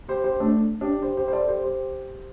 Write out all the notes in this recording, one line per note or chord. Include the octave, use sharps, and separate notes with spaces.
G4 C5
G4 C5
A3 D4
D4 G4
G4 C5
G4 C5
C5
A4 D5
G4 C5
G4 C5